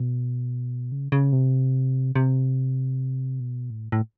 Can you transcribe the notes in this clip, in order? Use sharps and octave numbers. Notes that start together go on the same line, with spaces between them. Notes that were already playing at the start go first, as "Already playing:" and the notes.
Already playing: B2
C#3
C#3
C3
C3
B2
A2
A2